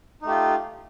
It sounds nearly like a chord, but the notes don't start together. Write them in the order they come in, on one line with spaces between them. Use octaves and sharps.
D#4 A3 G4 F4